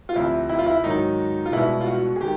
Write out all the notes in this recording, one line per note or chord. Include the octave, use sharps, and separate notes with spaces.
F4
D2 C3 F3 E4
E4
F4
E4
G#2 D#3 F#3 D#4
F4
C2 B2 G#3 B3 E4
F4
F#4
G#4
D#3 G#3 G4